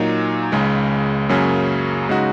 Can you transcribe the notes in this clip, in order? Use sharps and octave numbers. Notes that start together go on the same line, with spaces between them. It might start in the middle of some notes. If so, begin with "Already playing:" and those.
Already playing: A#2 F#3 A#3 D#4
C#2 C#3 G#3
F#2 C#3 F#3 A#3 C#4
C#3 G#3 D#4 F#4